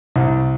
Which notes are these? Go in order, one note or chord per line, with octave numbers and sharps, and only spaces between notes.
C2